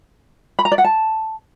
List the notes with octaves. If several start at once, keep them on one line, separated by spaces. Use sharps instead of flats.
B5
A#5
D5
F#5
A5